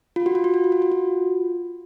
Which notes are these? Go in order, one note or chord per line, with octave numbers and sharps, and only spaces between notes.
F4
F#4
F4
F#4
F4
F#4
F4
F#4
F4